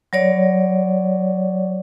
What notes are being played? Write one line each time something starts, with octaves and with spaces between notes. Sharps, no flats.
F#3 C#5 D5